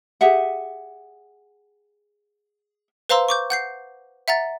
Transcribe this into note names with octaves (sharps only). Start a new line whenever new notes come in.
G4 G#4 E5 F#5
B4 C5 F5 A#5 C6 E6
C#6 D6 G6
F#5 G6 C7
E5 F#5 A#5 A6